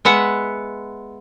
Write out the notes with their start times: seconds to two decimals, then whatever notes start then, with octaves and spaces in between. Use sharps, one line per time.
0.05 G#3 B3 E5 F#5